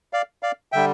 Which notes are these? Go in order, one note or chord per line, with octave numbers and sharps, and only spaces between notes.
D5 F5
D5 F5
D3 G3 E5 G5